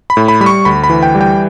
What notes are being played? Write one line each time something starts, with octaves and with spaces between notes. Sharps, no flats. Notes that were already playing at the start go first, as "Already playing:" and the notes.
B5
A2
B5
G3 B5
C#6
D2 B5
B5
E3
G5
G3
G5